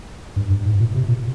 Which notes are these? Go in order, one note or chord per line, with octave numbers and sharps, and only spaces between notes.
G2
G2
G#2
A#2
C3
A#2